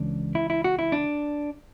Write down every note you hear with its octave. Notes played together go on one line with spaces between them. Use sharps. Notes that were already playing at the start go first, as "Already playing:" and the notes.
Already playing: C#2 C#3 E3 D4
E4
E4
F#4
E4
D4